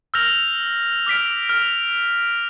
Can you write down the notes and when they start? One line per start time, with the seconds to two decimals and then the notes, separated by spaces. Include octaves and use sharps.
0.14 E6 F6 G6 A#6 F7 F#7
1.06 D6 F6 B6 D7
1.49 F6 F7